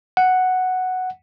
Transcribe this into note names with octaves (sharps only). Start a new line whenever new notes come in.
F#5